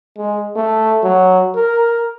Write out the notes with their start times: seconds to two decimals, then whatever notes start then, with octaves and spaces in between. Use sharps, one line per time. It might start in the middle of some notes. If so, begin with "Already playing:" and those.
0.18 G#3
0.56 A3
1.04 F#3
1.56 A#4